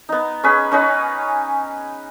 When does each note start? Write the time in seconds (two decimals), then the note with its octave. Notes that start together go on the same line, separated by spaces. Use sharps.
0.09 B3 D#4
0.44 C#4 G#4 B4
0.72 C#4 D#4 B4